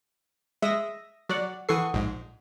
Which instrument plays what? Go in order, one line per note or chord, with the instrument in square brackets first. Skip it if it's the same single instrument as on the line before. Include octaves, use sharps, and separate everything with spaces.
[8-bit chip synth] G#3 [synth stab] E5 D#6 A#6
[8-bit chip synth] F#3 [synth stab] F#4 D5 F#5
[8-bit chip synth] E3 C#6 C7 [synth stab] A4 F#5 D#6
[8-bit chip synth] A#1 G#2